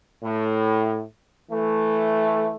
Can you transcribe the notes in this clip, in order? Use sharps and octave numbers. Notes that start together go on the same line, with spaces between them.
A2
E3 A3